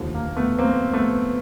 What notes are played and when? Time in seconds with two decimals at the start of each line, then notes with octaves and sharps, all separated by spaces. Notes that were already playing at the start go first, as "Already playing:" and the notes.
Already playing: F1 D#2 D3 F3
0.15 A#3
0.36 A3 B3
0.59 A#3 C4
0.93 A3 B3